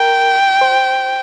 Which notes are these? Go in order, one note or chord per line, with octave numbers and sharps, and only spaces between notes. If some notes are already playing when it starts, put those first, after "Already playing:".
Already playing: A#4 G5
C5